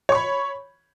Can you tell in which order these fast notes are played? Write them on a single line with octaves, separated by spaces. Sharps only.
C#5 C#6 B5